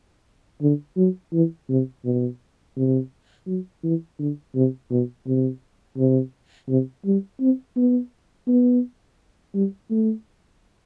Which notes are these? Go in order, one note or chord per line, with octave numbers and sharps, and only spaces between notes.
D3
F#3
E3
C3
B2
C3
F#3
E3
D3
C3
B2
C3
C3
C3
G3
C4
B3
B3
G3
A3